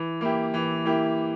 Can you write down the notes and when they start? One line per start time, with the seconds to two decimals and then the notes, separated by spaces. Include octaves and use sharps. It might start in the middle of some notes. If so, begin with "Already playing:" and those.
Already playing: E3
0.21 A#3 E4 G4
0.54 E3
0.85 A#3 E4 G4